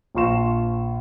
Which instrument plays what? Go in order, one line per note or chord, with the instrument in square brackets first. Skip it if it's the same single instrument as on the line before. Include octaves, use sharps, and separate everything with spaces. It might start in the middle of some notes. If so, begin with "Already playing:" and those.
[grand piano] A#1 F3 F4 C6 C#6 E7